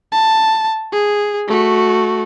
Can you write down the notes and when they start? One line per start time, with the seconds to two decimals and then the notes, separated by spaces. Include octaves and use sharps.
0.12 A5
0.92 G#4
1.47 A3 F#4